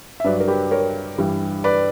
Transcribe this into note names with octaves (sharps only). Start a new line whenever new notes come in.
E5
G2 F#3 B4 D5
A#4
G4 B4
A#4 C#5
G2 E3 G3
B4 D5